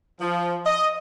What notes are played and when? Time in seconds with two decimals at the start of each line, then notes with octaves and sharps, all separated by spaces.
0.21 F3
0.66 D#5